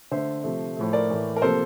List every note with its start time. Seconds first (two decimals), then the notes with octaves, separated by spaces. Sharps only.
0.11 D3 A3 C5 E5
0.43 C3 F3 A3
0.77 A2 F3 A3
0.93 A#4 D5
1.09 A2 E3 A3
1.36 A#4
1.42 C3 F3 A#3 A4 C5